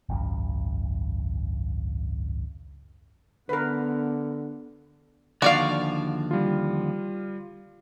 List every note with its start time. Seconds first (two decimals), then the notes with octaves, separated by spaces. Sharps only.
0.09 G#1 C#2 F#2
3.49 D3 B3 A#4 B4
5.42 D#2 D3 F3 F#4 D5 F5
6.31 G3 F4